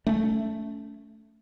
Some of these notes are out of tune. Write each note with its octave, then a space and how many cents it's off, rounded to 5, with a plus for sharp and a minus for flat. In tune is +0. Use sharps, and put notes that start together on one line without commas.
A3 +0 C#4 +30